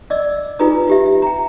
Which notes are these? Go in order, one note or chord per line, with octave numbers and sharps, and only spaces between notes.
D5 D#5 D6 E6
D#4 F4 G#4 B4 A#5 D#6
F4 G4 E5
G5 A#5